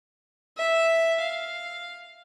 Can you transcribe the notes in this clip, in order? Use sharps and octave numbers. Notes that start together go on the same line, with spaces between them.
E5
F5